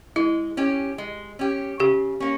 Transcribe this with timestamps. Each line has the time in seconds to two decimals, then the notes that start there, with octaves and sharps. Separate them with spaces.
0.16 G#3 E4
0.57 C#4 G4
0.98 G#3
1.39 C#4 G4
1.80 C#3 G4
2.20 A#3 C#4